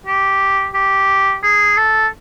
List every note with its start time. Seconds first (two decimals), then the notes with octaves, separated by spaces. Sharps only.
0.07 G4
0.74 G4
1.43 G#4
1.77 A4